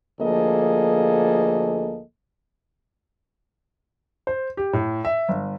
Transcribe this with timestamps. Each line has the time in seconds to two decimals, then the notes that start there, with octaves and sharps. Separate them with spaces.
0.21 D2 F3 A#3 G#4 A4 D#5
4.27 C5
4.57 G4
4.73 A2
5.05 E5
5.29 G1